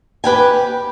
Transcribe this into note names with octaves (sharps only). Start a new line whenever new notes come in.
G4 B4 G5 G#5